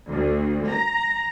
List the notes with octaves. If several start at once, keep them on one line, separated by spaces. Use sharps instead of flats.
D2
A#5